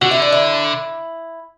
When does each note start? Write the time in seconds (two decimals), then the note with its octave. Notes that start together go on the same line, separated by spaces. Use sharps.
0.01 D3 F#4
0.11 E4
0.22 D4
0.32 E4